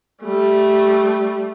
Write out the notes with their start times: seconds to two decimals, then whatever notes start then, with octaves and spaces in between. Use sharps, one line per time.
0.23 G3 A3